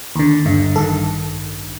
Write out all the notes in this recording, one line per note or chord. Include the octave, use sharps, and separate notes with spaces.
D#2 D3
G1 G2 D3
A1 G2 D#3 A4